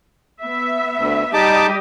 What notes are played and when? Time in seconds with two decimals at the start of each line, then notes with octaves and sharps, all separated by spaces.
0.41 B3 E5
0.98 D2
1.34 G3 D#4 G4 D#5 A5 D6